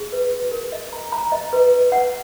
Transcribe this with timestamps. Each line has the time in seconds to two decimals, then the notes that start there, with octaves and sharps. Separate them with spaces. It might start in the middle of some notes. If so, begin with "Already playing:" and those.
Already playing: G#4
0.12 B4
0.32 F#4
0.51 A#4
0.72 D#5
0.93 A#5
1.12 A#5
1.32 D#5
1.53 B4
1.73 B4
1.92 F#5